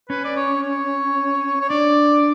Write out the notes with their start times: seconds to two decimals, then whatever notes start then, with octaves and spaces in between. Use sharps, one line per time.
0.09 C#4 B4
0.24 D5
0.36 C#5
0.63 C#5
1.61 C#5
1.69 D4 D5